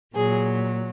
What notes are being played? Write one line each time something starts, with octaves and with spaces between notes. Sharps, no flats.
A#2 F#3 G#4